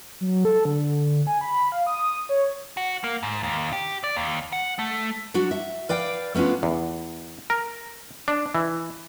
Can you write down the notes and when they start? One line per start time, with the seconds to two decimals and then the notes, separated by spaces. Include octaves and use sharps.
0.21 F#3
0.45 A4
0.65 D3
1.27 G#5
1.41 B5
1.72 F5
1.87 D#6
2.29 C#5
2.77 F#4
3.04 A#3
3.23 G#2
3.43 D#2
3.73 G4
4.04 D5
4.16 D#2
4.53 F#5
4.79 A3
5.34 F#3 D4 F#4
5.51 E5
5.89 B4 D5 F5 G5
6.34 A3 B3 C#4 D4 F4
6.63 E2
7.50 A#4
8.28 D4
8.55 E3